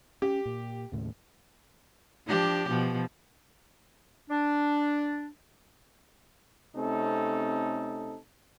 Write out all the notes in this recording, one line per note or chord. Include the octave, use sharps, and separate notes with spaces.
C#4 G4
A#2
D#2 A2 C#3
F3 D4 G4
B2 F3
D4
C3 A3 C4 C#4 D#4 A4